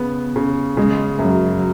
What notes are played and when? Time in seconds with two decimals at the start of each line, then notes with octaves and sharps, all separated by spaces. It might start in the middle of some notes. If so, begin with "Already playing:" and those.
Already playing: C#3 B3
0.36 C#3
0.77 C#3 G#3
1.19 F#2 F#3